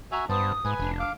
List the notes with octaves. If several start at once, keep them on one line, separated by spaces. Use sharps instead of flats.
F#4 E5 G#5 A#5
G2 B3 C5 A5 D#6
G#2 B4 G#5
F1 D4
F5 D6